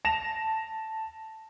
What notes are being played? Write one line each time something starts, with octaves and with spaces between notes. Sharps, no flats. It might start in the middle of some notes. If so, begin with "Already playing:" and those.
A5 A#6 E7 F7